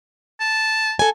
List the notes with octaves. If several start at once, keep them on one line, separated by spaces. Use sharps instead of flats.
A5
A4 G#5